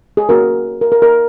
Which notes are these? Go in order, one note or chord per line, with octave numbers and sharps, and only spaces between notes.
G#4
A#3 C#4 F#4 A#4
A#4
A#4
A#4